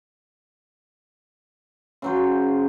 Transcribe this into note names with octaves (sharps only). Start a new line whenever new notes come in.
C#3 F#3 C5